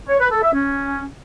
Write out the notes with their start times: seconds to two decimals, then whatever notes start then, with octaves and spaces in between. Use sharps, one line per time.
0.09 C#5
0.20 B4
0.31 A4
0.42 E5
0.54 C#4